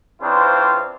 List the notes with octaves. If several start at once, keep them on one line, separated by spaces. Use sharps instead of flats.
C#3 E3 C4 D4 F4 C5